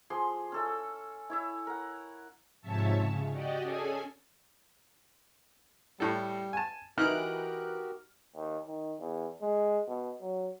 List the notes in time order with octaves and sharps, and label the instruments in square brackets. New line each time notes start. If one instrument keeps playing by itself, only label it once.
[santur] F3 G#4 C6 D6
C#4 A4 E5
E4 C#5 E5
A#4 F#5
[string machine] G#2 C3 F3 C#5 E5 A5
C#3
F#4 G4 D5 D#5
C#4 G#4 A4 G#5
[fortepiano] A2 A4 [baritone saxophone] G3
[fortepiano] G#5 A5
[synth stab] E3 F#6 D7 [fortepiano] D#4 [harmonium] F#4 G4 A#4 [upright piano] F6
[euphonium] D#2
D#3
E2
G#3
B2
F#3